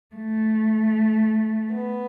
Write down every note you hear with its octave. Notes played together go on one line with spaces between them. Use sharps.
A3
B3